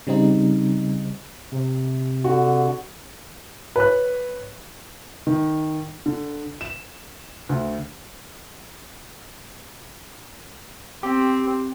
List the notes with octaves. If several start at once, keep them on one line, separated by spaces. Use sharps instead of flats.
C#3 G3 C4 D#4
C3
D3 F#4
B4 C#5 F#6
D#3
D3
E7
D2
C4 G4